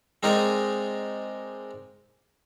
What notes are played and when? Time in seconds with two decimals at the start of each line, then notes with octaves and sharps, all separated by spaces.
0.23 G#3 C4 D4 D#4 G#4 A#4